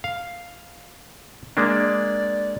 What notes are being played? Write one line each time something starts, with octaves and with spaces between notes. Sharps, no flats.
F5
G#3 A#3 D4 D5